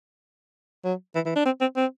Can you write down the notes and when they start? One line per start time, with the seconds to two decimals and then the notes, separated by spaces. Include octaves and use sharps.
0.84 F#3
1.15 E3
1.26 E3
1.36 D4
1.45 C4
1.61 C4
1.76 C4